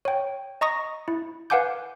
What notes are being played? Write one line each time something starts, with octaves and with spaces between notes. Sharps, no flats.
C#5 G5
D#5 A#5 C#6 D#6 A#6
E4
B4 F5 F#5 G#5 D6 G6